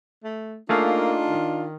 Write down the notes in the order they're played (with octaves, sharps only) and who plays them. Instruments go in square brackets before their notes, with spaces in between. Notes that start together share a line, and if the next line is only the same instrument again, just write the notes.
[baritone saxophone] A3
[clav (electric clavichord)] A3 G#4 F5 [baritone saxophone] A#3 [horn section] D4 D#4 F4
[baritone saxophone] D#3